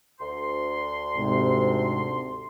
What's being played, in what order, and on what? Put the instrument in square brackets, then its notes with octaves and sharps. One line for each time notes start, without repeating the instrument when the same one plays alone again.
[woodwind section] D2 C6
[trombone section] G#2 C3